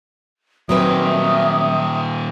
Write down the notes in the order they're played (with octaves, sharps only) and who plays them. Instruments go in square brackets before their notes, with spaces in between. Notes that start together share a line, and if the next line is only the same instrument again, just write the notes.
[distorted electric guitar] A#2 D#3 [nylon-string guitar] F#3 C4 B4 [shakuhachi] E5 [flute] D#6